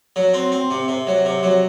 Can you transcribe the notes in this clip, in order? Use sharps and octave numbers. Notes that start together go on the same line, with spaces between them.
F#3
C4
C4
C3
C3
F#3
C3
F#3